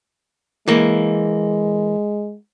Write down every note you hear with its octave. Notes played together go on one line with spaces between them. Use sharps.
E3 G#3 A#3